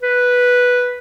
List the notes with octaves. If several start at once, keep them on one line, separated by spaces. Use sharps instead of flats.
B4